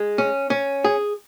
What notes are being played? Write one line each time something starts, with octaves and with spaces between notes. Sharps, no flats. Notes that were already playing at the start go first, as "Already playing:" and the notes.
Already playing: G#3
C#4
C#4
G#4